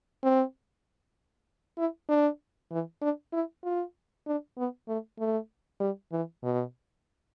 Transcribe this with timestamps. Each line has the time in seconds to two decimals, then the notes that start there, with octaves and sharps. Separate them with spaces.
0.24 C4
1.78 E4
2.09 D4
2.72 E3
3.01 D4
3.33 E4
3.64 F4
4.27 D4
4.58 B3
4.88 A3
5.19 A3
5.80 G3
6.12 E3
6.43 B2